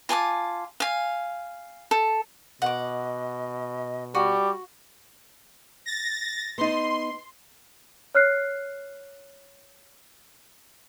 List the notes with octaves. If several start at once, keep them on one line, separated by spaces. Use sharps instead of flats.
F4 G#5 A5 D6
F5 G#5
A4
B2 D#5 F#5 D6
G3 F#4 D6
A6 A#6
B3 D#4 C6
C#5 F6 F#6 C7